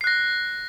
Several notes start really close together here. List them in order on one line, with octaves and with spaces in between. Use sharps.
C7 F#6 A#6